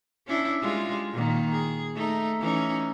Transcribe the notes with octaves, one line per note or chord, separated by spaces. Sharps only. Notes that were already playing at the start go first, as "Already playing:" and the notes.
C#4 D4 E4
G3 G#3 F4
A#2 D#3
G#4
A3 D#4
E3 C#4 D#4